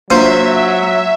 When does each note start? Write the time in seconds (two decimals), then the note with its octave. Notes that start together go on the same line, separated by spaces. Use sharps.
0.10 F#3 A#3 D4 F4 C5 E5